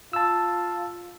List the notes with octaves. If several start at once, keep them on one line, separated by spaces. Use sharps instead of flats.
F4 A5 E6